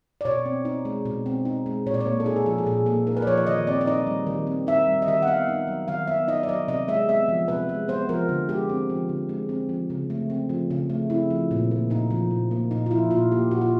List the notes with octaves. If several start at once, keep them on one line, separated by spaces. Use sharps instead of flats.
D5
B2 C#5
C4
D#4
G#3
B2
C4
D#4
G#3
A#2 C#5
D5
C#5
A#3
A4
D#4 G#4
A4
F3 G#4
A4
A#2 G#4
A#3 A4
D#4 A#4
B4
D5
F3 C#5
D5
D#3 D#5
C4 D5
D5
D#4 D#5
G3
D#3
C4
D#4 E5
G3
D#5
D#3 E5
F#5
B3 F5
D#4
F#3
D#3 F5
B3 E5
D#4 D#5
D5
F#3 D#5
C3 D#5
G#3 E5
B3 E5
F3
C3 B4
G#3
B3 C5
F3 A#4
D3
G#3 G4
C4
F3
D3
G#3
C4
F3
C#3
A3
C4
F3
C#3
A3
C4 E4
F3
A#2
A#3
A#2 D#4
F3
A#2
A#3
A#2 D#4
F4
F3 E4
A#2 F4
A#3 G4
A#2 F#4
F4